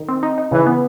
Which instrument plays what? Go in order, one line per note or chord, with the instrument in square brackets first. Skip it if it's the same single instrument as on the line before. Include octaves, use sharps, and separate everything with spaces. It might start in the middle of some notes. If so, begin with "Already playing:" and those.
Already playing: [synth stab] D#3 D#4
C4
D#4
D#4
[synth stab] C#3 [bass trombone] E3
[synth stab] B3